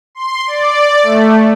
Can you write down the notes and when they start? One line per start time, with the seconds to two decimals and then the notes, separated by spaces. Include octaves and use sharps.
0.15 C6
0.47 D5
1.03 A3